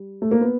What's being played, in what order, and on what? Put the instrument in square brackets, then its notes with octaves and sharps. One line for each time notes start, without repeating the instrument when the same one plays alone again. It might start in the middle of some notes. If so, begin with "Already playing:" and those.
Already playing: [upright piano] G3
A3
A#3
B3